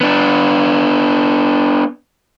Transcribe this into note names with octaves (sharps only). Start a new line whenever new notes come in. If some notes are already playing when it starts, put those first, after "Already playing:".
B3 D4